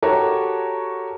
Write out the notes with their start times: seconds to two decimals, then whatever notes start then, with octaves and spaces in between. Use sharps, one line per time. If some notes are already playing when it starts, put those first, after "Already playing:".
0.02 F#4 G4 A4 A#4 C#5 F#5